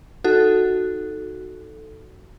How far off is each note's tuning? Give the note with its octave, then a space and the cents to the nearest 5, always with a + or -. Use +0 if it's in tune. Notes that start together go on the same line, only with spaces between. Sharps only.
D#4 +0 F#4 +0 A4 +0